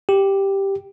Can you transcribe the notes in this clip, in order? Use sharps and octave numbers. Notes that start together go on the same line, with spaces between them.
G4